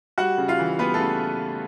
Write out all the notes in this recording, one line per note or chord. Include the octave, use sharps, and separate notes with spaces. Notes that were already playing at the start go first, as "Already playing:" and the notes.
G3 F#4 F#5
C#3
F4 F5
E3
G3 B3 B4
A3 A4
C#3